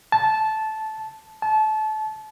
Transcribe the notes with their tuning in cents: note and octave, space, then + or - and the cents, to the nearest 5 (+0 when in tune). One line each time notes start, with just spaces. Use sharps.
A5 -15
A5 -30